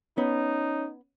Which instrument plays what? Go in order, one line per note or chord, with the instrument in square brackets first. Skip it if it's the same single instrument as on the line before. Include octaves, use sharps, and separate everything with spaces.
[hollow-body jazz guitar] B3 [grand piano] C#4 [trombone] D#4